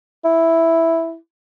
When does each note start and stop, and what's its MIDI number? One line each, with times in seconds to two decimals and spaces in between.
0.25 1.16 64